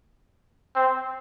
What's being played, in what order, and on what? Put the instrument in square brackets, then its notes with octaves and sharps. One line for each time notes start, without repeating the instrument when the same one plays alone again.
[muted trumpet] C4